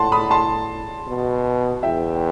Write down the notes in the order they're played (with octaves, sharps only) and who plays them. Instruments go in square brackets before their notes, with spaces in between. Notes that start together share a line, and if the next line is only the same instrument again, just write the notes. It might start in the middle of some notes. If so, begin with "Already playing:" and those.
Already playing: [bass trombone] A2 [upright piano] F#5 A5 C6
[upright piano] B5 D#6
A5 C6
[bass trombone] B2
[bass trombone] E2 [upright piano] E5 G5
[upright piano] G5